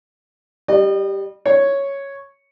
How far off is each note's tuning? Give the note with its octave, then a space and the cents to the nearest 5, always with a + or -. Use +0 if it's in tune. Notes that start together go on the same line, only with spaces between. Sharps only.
G3 +0 D#5 -35
C#5 +0 C#6 +0